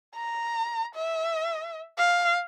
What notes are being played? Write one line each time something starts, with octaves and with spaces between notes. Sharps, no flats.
A#5
E5
F5